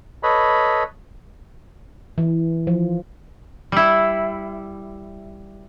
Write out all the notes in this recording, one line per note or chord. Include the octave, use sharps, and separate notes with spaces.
A4 B4 C#5 D#5 B5
E3
F3
G3 E4